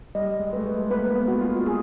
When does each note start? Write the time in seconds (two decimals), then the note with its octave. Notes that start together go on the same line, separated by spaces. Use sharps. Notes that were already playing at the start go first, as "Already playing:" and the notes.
0.15 G3 D#5
0.39 G#3
0.53 A3 B4
0.65 G#3
0.91 A#3 B4
1.15 B3
1.28 F#4
1.41 F4
1.66 G#4